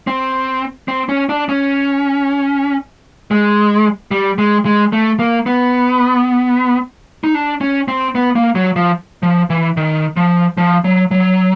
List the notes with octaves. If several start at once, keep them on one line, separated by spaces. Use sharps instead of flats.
C4
C4
C#4
D4
C#4
G#3
G3
G#3
G#3
A3
A#3
B3
D#4
D4
C#4
C4
B3
A#3
F#3
F3
F3
E3
D#3
F3
F3
F#3
F#3